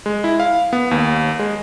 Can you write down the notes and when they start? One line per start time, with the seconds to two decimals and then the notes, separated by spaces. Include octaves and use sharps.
0.06 G#3
0.24 E4
0.40 F5
0.73 B3
0.91 D#2
1.39 G#3